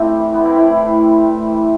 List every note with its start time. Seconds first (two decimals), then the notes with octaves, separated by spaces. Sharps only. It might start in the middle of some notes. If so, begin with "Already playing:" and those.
Already playing: A3 C4 D4 E4 G4
0.13 E3 G3
0.34 C3 B3
0.45 C4 E4
0.56 E3 A3 C4 E4
0.78 A2
1.00 G3
1.22 A2
1.44 E3 G3